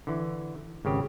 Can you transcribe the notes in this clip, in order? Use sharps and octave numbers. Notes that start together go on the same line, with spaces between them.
D3 E3
G#1 C#3 G4